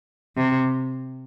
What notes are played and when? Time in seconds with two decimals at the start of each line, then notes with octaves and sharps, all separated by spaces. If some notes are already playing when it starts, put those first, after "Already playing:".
0.37 C3